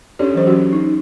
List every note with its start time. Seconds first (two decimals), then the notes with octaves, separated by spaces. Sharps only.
0.19 C#4 D4 G4 A4 C#5 D5
0.35 E3 F#3 C5
0.47 C#4 D4 F#4
0.73 D#4